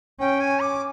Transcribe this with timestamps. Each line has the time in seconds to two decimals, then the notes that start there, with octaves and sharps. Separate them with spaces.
0.20 C#4 G5
0.40 G#5
0.60 D6